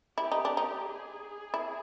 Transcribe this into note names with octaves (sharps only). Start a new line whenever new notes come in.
E4 G4
D#4
D4
D#4
G#4
E4